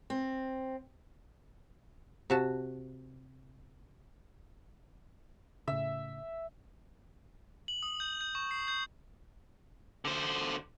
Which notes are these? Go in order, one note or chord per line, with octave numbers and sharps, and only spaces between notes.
C4
C3 F#4 A5
A2 C#3 E5
F#7
D#6
G6
G6
C#6
C7
G6
D3 C5